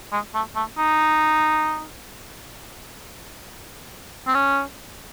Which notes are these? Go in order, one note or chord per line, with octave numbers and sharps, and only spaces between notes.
G#3
A3
A3
D#4
C4
C#4